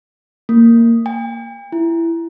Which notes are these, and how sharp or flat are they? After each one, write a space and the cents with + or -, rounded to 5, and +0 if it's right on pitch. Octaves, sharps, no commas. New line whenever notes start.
A#3 -10
G5 +45
E4 +15